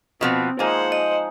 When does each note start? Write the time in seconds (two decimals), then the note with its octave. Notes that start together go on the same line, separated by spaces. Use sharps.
0.21 B2 F3 B3 C4
0.59 F3 G#3 A#3 D#4 C5 F#5 G#5
0.92 D#5